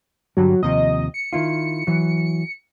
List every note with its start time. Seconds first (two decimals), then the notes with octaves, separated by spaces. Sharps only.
0.37 G2 D3 F#3 G3
0.63 D#2 C3 F3 D#5
1.14 C#7
1.33 D#3 E4 F4
1.87 E3 F#3